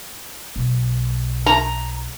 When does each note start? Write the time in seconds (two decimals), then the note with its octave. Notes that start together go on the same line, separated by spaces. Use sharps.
0.56 B1
1.46 A#5